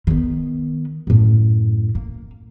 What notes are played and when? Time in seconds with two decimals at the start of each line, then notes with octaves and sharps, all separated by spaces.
0.07 D#3 B3
1.07 F#2 A2
1.95 A#3